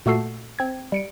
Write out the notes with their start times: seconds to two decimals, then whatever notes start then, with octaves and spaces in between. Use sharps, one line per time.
0.06 A#2 A3 F#4 A4 C7
0.59 C4 G#6
0.92 G3 C#7 D7